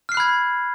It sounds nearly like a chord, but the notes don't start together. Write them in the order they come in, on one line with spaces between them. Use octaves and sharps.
F6 C7 F#6 B5 G#6